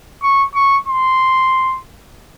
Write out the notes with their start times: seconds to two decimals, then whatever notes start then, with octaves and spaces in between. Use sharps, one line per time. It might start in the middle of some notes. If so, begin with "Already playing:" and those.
0.23 C#6
0.55 C#6
0.88 C6